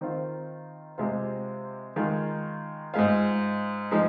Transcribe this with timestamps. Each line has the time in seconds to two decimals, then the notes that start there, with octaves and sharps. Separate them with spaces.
0.01 D#3 C4 F4
0.98 C3 G#3 C4 F4
1.96 D#3 G#3 F4
2.94 G#2 G#3 F4
3.91 F3 G#3 D#4